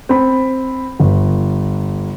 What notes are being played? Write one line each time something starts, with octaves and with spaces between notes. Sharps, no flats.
C4 B5
G1